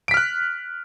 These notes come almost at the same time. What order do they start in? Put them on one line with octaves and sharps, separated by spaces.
D7 B6 F6 F#6